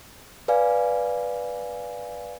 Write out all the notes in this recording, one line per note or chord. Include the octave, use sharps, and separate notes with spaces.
B4 D5 F5 G#5